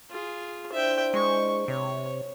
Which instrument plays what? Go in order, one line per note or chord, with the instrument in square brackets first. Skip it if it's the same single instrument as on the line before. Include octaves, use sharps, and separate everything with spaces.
[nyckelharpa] F4 G#4
[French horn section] D4 E4 C5 [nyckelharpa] E5 G5
[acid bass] G#3 [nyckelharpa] C#6
[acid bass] C3 [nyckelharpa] C#5